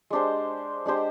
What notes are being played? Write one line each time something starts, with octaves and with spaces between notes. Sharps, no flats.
G#3 D4 G4 C5
G#3 D4 G4 C5